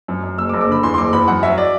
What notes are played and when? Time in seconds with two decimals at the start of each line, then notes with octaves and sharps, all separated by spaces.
0.08 F#2
0.24 F#2
0.38 F#1 E6
0.49 D6
0.54 F#1
0.61 D6
0.68 D3 B5
0.83 E2 C6
0.94 C6
0.98 F#1 D6
1.13 E2 B5
1.28 F#2 F#5
1.43 F#3 E5
1.58 D5